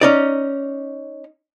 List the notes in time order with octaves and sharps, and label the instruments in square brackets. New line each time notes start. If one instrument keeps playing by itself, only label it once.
[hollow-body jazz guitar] C#4 D#4 D5